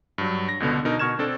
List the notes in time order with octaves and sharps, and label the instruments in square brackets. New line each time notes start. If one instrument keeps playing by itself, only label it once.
[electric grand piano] G2 F#3
A#6
C#2 B2 D3 B3
B2 D#4 A#4
B2 C#6 F6 G#6 E7
C4 D4 A4